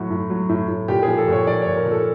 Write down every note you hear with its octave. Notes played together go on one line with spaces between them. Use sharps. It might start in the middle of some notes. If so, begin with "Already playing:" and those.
Already playing: A2 F#3 F#4
A2
F#3
A2
A2
A#2 G4
G#4
F3
A4
A#2 C#5
F3 D5
A#2 C#5
A#4
A#2
A4